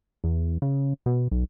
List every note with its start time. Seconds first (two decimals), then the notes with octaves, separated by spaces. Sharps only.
0.24 E2
0.62 C#3
1.06 B2
1.31 B1